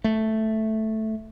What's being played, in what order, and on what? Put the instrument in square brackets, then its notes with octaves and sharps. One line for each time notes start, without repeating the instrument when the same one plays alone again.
[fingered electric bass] A3